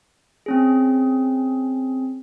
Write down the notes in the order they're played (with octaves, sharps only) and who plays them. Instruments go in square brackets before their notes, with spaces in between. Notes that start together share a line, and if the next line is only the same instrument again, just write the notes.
[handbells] C4 C#4 G#4